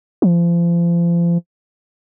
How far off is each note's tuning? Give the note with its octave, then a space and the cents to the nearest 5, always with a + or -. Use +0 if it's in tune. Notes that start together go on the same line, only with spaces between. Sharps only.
F3 -35